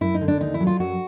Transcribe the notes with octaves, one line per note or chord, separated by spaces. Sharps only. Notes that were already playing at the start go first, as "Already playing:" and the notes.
F#2 E4
D#4
D3
D4
D#2 D#4
E4
F#3
F4
F#2 F#4